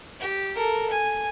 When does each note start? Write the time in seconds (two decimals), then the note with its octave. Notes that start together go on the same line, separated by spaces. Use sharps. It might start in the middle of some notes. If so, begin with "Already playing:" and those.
0.20 G4
0.55 A4 A#4
0.90 G#5